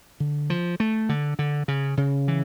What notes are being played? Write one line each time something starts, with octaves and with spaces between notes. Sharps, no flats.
D3
F3
A3
D3
D3
C#3
C#3
E3